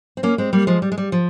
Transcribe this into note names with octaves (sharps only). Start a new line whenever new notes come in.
C4
A#3 C#4
G#3 C4
G3 A#3
F3 G#3
G3
G#3
G3
F3